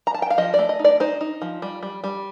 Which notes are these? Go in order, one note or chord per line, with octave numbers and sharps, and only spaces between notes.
A#5
A5
G5
F5
F3 D#5
D5
A3
D#5
D#4
D5
D#4 C5
D#4
F3
G3
G3
G3